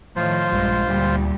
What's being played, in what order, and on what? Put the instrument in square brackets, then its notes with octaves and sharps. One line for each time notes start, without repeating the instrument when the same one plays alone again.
[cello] A2 D#3 [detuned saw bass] F3 [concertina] F4 C5
[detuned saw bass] A#1 [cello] G2 G#3
[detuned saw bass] D2 [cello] A#2 G3